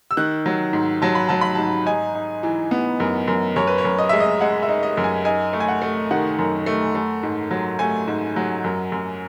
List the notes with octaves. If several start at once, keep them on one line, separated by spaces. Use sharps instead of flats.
E6
D#3 F#6
F#3
G#2
F#3 A5
B5
F#3 A5
B5
G#2 A5
D#4 G#5
D#4
E3
B3
F#2
F#2
F#2 C#5
B4
C#5
F#2
D#5
G#3 E5
D#5
G#3 F#5
E5
D#4
D#5
F#2
G#5
D#4 G#5
A3
G#5
F#5
A3
D#3 F#5
F#2
A3
A3
G#2
F#3
A3 G#5
G#2
F#3
F#2
F#2